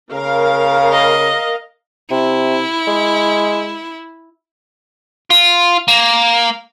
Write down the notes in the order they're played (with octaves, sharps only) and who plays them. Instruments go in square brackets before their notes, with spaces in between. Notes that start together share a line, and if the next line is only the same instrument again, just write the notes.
[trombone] C#3 [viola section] A#4 F5
[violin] D#5
[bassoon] C3 [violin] E4
[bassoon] G#3
[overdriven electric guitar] F4
A#3